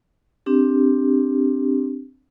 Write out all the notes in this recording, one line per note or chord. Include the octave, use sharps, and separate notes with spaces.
C4 D4 G4